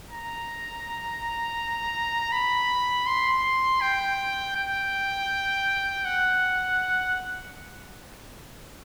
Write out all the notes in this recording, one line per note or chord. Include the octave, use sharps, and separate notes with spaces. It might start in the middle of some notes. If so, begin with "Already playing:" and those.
A#5
B5
C6
G5
G5
F#5